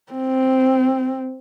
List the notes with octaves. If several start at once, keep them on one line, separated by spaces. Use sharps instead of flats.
C4